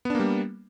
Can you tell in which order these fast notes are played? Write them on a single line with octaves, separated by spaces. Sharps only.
B3 D4 A#3 G3